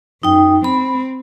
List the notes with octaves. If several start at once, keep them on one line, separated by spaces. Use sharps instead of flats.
F#2 D#4 G5
C4 B5